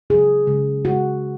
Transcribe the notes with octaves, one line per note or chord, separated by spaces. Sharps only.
C#3 F#3 G#4
C#3 G#3
C#3 G#3 F#4